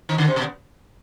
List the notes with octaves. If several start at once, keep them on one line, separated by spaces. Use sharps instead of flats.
D#3 D#4
D3 D4
C3 C4
B2 B3